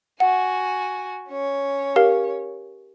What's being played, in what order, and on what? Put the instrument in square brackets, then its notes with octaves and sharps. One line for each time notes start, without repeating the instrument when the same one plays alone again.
[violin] F#4 G#5 [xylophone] F#5
[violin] C#4 C#5
[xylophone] G4 A#4 F5